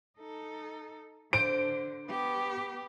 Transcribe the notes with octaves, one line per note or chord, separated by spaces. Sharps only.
D#4 A4
D3 C5 D7
B3 G4